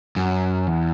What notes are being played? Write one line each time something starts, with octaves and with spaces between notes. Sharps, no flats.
F#2
E2